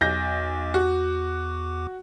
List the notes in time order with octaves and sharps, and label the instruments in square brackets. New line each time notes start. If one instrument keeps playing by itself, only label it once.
[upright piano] B1 G6 A#6 [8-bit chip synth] E2 D6
[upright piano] F#4